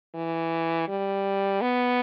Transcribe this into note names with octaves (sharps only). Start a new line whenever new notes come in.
E3
G3
B3